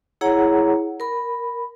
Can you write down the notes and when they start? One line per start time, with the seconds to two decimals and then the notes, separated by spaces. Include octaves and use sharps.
0.21 E4 G#4 C#5 F#5 A#5
1.00 A#4 B5